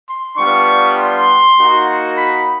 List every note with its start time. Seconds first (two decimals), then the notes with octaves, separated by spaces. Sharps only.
0.08 C6
0.37 G3 B3 D4 F4 C#6
0.97 C6
1.58 A#3 D#4 F#4
2.17 B5